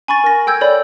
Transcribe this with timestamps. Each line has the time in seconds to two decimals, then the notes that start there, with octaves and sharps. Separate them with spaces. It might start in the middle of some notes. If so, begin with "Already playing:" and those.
0.08 G#5 B5 C#6 A6
0.24 A#4 A#6
0.47 A4 G5 E6 G6 G#6
0.61 A4 C#5 D5 B5